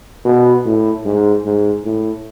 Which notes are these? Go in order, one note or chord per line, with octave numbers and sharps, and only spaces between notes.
B2
A2
G#2
G#2
A2